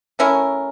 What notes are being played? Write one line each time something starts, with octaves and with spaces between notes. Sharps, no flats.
A3 C#4 E4 A#4